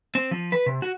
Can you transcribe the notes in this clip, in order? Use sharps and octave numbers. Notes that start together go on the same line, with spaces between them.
C4
F3
B4
C3
F#4